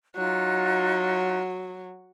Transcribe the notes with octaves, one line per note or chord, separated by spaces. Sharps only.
F#3 D#4 F4 F#6